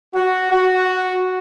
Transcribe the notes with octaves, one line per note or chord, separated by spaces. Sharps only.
F#4
F#4